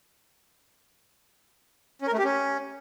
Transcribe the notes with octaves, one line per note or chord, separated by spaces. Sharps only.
C#4
A#4
A3
G4
C#4